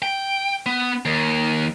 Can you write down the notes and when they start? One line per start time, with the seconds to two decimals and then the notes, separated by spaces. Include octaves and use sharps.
0.02 G5
0.66 B3
1.05 D#2